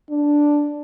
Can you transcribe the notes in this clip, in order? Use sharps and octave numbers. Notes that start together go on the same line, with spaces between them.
D4